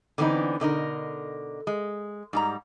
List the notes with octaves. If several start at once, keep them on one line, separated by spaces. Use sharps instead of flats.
D3 E3 B3 C4 D#4
B2 D3 D#4 A#4
G#3
G#2 G3 A#5